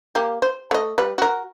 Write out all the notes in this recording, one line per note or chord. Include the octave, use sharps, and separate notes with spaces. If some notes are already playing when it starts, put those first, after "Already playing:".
A#3 G4
C5
A3 D#5
G3 B4
F#4 A#4